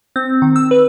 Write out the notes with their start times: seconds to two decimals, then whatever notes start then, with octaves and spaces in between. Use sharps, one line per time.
0.16 C4
0.42 D#3
0.56 E6
0.71 B4